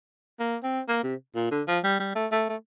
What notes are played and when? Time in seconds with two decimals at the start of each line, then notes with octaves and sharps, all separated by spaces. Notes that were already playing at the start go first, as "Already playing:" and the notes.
0.39 A#3
0.63 C4
0.88 A#3
1.03 C3
1.35 A#2
1.51 D3
1.68 F3
1.84 G3
2.00 G3
2.15 A3
2.32 A3
2.49 A3